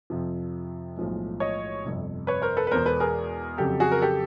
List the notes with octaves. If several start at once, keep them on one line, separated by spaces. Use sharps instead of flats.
F2 C3 F3
B1 A2 F3 G#3
C#5 D#5
G1 F2 C3
B4 C#5
A#4 C5
A4 B4
B4
E2 B2 G#3 A#4 C5
A4 B4
G#4 A#4
F2 C#3 F#3 G4 A4
F#4 G#4
A#4
G4 A4